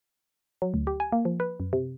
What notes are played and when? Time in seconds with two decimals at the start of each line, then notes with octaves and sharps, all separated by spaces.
0.62 F#3
0.74 D2
0.87 G4
1.00 G#5
1.12 A#3
1.25 F3
1.40 B4
1.60 F#2
1.73 C3